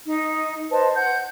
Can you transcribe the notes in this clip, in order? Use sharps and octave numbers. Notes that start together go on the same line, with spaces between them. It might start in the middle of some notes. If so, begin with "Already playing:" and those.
D#4
B4 C5 D#5 A5
F#5 G6